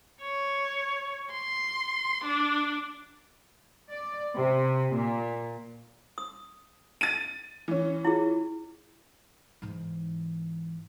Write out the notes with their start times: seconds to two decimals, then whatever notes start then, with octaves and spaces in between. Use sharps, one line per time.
0.22 C#5
1.31 C6
2.24 D4
3.91 D5
4.34 C3
4.92 A#2
6.18 D#6
7.01 A6 D#7
7.68 E3 C#4
8.05 E4 F4 G#4
9.62 G#2 E3